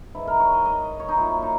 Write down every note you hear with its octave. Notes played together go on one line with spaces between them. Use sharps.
G#2 E3 E4
A#4
C#5
D#5
D#5
C#5
D#4
A#2 F#3 E4
D#4